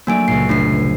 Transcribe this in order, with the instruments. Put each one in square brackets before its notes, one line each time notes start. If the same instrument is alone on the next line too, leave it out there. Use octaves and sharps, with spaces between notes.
[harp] F#3 A3 D4 [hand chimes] A#3 G#5 D7
[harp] C#2 A#2 [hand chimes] C7
[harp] F1 [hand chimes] A3 D4 C7